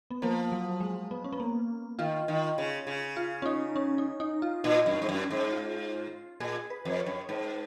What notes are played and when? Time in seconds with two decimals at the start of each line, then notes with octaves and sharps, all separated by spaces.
0.10 B3
0.22 F3 A#3
0.52 F#3
0.80 G#3
1.11 B3
1.24 C#4
1.32 B3
1.40 A#3
1.99 D#3 F4
2.28 D#3
2.58 C#3
2.87 C#3
3.17 F4
3.42 C#4
3.46 D#4
3.76 C#4
3.98 D#4
4.20 D#4
4.42 F4
4.64 A#2 D#4
4.86 F#2
4.93 C#4
5.02 G#2
5.09 F#2
5.31 G#2
5.52 F4
6.40 A#2 G#4
6.70 B4
6.85 F2
6.91 B4
7.00 C#5
7.06 F#2
7.29 G#2 B4